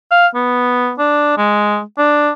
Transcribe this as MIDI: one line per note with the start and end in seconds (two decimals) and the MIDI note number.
0.11 0.27 77
0.35 0.93 59
0.99 1.33 62
1.37 1.80 56
1.98 2.31 62